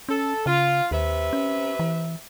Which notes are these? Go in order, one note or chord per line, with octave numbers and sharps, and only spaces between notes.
C#4 A4
C#3 F4
D#2 C3 B4 E5
C#4
E3